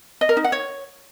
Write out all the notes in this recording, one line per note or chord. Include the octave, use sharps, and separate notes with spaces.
D#5
A#4
D#4
F#5
C#5